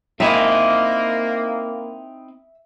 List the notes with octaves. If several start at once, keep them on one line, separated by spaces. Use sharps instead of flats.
A#3 C4 D#4 E4 E5